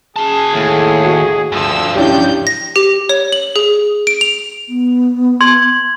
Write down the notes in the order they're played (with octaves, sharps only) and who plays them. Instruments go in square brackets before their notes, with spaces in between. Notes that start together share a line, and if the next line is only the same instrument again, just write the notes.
[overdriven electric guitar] F#4 A5 [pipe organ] G#4
[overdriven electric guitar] D#2 [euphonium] A2
[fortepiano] F#4
[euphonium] D2 [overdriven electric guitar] G2 F3 [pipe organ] E6
[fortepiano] C#4 D4 E4 [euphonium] G4 [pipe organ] G6
[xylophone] A#6
G4
C#5
F#7
G#4
D7
F7
[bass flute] B3
[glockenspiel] C6 G#6 F#7